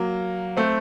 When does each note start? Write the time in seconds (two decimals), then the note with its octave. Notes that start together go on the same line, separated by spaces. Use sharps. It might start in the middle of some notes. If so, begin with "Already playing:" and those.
Already playing: F#3 A#3
0.57 A3 C4